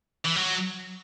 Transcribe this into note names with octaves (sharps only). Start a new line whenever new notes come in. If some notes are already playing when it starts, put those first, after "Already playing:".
E3
F#3